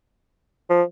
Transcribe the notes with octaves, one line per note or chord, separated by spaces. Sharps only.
F3